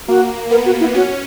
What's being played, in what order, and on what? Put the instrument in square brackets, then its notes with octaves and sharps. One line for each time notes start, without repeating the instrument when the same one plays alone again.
[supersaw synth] A#3 [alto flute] F#4
[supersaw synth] B3 [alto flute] A#4
[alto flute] F#4
E4
[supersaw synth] C#4 [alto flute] F#4